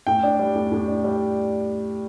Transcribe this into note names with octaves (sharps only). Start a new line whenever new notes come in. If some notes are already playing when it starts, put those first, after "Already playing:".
A2 G5
D4
G3
A2
A2
D4
G3